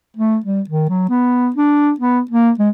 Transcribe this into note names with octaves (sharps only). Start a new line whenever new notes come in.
A3
G3
D#3
F#3
B3
D4
B3
A#3
G#3